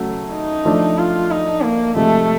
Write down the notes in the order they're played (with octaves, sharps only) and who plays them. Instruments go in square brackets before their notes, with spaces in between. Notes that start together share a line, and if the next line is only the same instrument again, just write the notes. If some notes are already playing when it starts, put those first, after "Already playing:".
Already playing: [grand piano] C#3 F#3 A3
[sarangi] D#4
[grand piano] F3 A3 D4
[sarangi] F4
D#4
A#3
[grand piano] C3 F3 G#3 [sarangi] A3